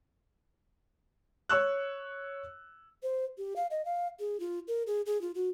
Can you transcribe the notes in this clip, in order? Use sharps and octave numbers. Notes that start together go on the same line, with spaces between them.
C#5 C#6 E6 F#6
C5
G4
F5
D#5
F5
G#4
F4
A#4
G#4
G#4
F4
F#4